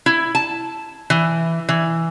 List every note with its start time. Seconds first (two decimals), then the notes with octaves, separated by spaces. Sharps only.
0.06 E4
0.35 A5
1.10 E3
1.69 E3